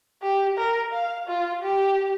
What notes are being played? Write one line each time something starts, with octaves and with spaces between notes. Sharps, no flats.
G4
A#4
F5
F4
G4